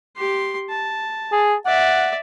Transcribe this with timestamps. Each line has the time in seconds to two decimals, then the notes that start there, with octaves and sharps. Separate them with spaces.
0.16 G4 C6
0.70 A5
1.32 G#4
1.66 D5 E5 F#5